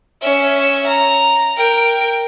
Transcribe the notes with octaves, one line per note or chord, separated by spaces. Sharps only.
C#4 E5
A#5
A#4 G5